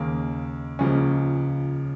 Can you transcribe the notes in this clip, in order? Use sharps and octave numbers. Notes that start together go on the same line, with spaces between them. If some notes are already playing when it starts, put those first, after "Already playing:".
Already playing: D#2 C#3 A#3
C#2 C#3 F3 A#3 C#4